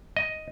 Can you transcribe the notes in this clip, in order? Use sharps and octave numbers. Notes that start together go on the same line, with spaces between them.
D#5